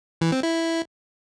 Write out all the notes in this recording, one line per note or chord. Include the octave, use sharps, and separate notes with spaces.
E3
C4
E4